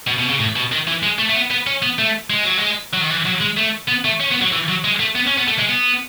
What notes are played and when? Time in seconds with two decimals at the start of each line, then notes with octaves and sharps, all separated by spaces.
0.08 B2
0.19 B2
0.30 C#3
0.39 A2
0.56 B2
0.72 D#3
0.88 E3
1.03 G#3
1.18 A3
1.29 A3
1.35 B3
1.51 B3
1.67 C#4
1.82 B3
1.99 A3
2.30 G#3
2.44 F#3
2.57 G#3
2.93 F#3
3.01 D#3
3.10 E3
3.25 F#3
3.41 G#3
3.57 A3
3.88 B3
4.05 A3
4.21 C#4
4.31 B3
4.42 F#3
4.53 E3
4.68 F#3
4.84 G#3
5.00 A3
5.15 B3
5.27 C#4
5.38 B3
5.47 A3
5.59 G#3
5.69 B3